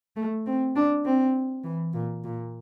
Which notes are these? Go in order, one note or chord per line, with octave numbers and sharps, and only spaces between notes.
A3
C4
D4
C4
E3
A#2
A#2